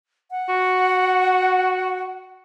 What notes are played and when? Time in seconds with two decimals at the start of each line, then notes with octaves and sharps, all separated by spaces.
0.31 F#5
0.49 F#4